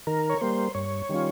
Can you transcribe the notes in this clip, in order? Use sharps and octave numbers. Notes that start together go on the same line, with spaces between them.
D#3 A#4
C#5
G3 A#3 C5
G2 C#5
D#3 G3 C#4 F4